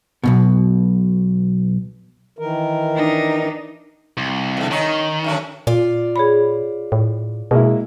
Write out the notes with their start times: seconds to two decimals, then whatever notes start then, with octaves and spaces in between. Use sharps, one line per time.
0.24 B1 G#2 B2
2.39 D#3 E3 A#4
2.96 D4 D#4
4.17 C2
4.57 E2 D3
4.71 D#3 C#4 D#4
5.24 F#2 A2 C#4
5.67 A#2 F4 D5
6.16 G#4 C#5 B5
6.92 A2
7.51 B2 G#3 A#3 E4